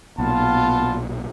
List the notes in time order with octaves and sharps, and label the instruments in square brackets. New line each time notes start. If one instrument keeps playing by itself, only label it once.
[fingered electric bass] B1 A#2 [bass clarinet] B3 [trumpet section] F4 A5